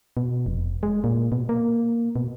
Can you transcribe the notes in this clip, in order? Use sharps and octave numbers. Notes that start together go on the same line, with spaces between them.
B2
F1
G#3
A#2
B2
A#3
B2